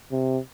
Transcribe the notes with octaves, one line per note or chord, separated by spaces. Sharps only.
C3